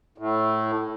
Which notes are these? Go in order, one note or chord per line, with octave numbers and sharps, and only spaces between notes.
A2